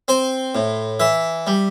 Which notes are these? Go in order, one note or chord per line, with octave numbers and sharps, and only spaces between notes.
C4 C5
A2
E3 E5
G3